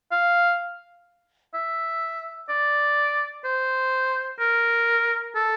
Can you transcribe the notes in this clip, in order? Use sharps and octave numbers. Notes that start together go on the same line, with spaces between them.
F5
E5
D5
C5
A#4
A4